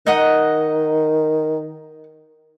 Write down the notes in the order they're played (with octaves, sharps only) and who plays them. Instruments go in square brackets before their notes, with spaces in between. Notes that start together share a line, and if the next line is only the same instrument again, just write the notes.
[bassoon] D#3 [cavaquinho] D#4 D#5 F#5